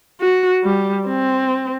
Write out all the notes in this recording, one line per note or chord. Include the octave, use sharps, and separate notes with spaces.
F#4
G3
C4